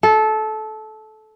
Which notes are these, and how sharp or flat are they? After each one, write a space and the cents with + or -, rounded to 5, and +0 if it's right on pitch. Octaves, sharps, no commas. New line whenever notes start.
A4 -20